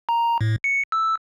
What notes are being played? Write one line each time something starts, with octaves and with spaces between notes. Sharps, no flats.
A#5
A2
C#7
E6